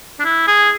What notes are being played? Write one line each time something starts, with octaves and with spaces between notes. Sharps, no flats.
D4
E4
G#4